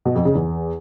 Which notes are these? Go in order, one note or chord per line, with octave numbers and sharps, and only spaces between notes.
B2
F2
C#3
E2